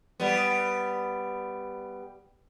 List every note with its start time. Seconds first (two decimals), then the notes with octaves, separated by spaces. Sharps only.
0.20 G3 B3